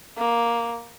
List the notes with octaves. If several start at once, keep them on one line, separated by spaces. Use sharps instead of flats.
A#3